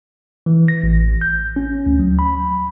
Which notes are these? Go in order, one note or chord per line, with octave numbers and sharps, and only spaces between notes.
E3
A#6
A1
G6
C#4
D2
F#3
B5